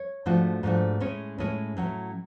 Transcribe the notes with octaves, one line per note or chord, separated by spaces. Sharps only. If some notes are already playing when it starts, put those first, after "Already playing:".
Already playing: C#5
G#2 F3 A3 D4 F#4
G#2 F3 A3 D4 F#4
A2 G#3 C#4 G#4 C#5
A2 G#3 C#4 G#4 C#5
A2 F#3 C#4